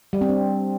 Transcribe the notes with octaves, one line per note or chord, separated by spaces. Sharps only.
G3
C4
D4